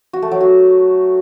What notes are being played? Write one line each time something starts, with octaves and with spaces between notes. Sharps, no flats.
F#4
A3
F#3
F#4